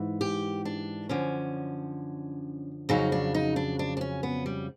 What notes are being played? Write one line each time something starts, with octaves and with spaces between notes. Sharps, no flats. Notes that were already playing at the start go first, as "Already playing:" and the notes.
Already playing: G#2 E3
G4
D4
F#2 D3 F3 C#4
F2 C#3 F#3 D#4
D4
D#4
D4
D4
D4
C#4
B3
G3